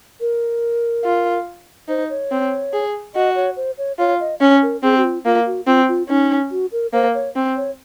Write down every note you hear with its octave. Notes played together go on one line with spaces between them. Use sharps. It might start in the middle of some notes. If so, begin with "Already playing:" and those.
A#4
F4
D#4 C5
C#5
C4
G#4
F#4 D#5
C#5
C5
C#5
F4 C#5
D#5
C#4 C#5
A#4
C4 G#4
F#4
F4
A#3 F4
F#4
C4 F4
F4
C#4 D#4
F#4
A#4
A#3 C5
C#5
C4
C#5